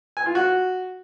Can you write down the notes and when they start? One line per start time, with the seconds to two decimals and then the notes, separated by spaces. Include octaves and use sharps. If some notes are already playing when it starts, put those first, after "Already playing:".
0.17 G#5
0.26 F4
0.35 F#4